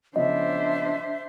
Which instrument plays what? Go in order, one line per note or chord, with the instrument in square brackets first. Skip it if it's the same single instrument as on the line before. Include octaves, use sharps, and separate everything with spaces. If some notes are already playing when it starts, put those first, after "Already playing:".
[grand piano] C#3 F3 B3 [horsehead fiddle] D4 C5 [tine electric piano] D#5 [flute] E5